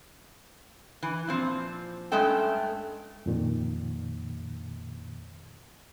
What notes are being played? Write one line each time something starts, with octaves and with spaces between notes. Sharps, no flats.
E3
A#2 F3 C4
G2 G#3 A3 C#4 A4 G5
F2 A#2 D#3